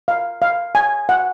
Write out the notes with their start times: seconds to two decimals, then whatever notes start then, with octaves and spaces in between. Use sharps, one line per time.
0.08 F5
0.42 F5
0.75 G#5
1.09 F#5